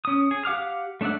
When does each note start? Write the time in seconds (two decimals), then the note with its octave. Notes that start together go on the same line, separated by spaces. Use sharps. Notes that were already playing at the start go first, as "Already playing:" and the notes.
0.05 C#4 D#6
0.31 G#4
0.45 G4 F5 F#5 D6 F6
1.01 A3 D4 D5 E5 F#5